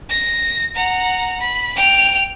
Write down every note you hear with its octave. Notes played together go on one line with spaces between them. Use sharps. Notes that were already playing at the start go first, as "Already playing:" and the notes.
A#6
F#5 A#5
B5
G5 F7